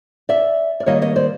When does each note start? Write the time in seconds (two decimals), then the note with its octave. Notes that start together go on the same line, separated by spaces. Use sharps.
0.29 D5 E5
0.80 D5
0.86 D#3 G3 A#3 C#5 D#5
1.02 C#5 D#5
1.16 C5 D5